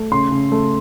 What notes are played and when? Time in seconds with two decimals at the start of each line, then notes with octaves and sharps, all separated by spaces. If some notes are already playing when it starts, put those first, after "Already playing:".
Already playing: A3
0.11 C#3 C6
0.32 C#3
0.52 A3